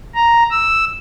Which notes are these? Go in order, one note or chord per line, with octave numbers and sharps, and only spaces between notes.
A#5
E6